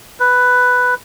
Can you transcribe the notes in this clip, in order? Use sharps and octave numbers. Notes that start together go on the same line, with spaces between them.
B4